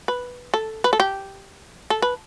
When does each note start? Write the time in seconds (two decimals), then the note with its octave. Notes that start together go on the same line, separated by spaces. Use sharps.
0.08 B4
0.54 A4
0.84 B4
0.93 A4
1.00 G4
1.90 A4
2.02 B4